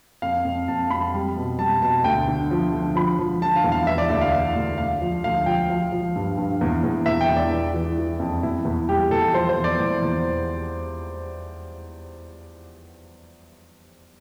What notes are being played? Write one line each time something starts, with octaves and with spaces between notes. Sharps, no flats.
F2 F5
F2
F2 A5
F2 B5
G3
B2
G3 A5
B2 A5
D2 G5
D3
F3
D3
F3 B5
F3
D3 A5
F5
E2
F5
E3 E5
D5
D2 E5
F5
E3
D2
D2 F5
F3
D2 F5
F3 G5
F3 F5
F3
G2
G2
E2
E2
E2 E5
G5
E2
D5
E3
E3
E3
F2
E2 E4
E2
G3 G4
E2 A4
F3 C5
C5
E2
D5
E2
E2